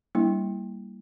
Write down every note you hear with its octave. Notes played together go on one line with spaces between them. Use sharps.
G3 A#3 D4 E4